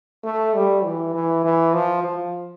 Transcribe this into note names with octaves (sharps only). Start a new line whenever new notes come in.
A3
G3
E3
E3
E3
F3
F3